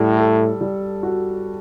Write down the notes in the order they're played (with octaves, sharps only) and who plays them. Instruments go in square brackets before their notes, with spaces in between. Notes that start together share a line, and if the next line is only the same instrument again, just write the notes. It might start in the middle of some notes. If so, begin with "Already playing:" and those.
Already playing: [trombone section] A2 [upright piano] G3
[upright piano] A4
G3
F#4